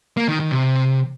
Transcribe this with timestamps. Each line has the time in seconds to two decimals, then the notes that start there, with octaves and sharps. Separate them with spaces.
0.17 A#3
0.28 D#3
0.40 D#3
0.52 C3